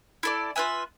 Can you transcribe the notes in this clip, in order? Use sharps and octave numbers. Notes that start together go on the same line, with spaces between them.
E4 A4 D5
F4 B4 E5 G#5